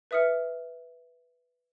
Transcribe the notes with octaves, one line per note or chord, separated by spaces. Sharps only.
B4 E5 D#6 F6 C#7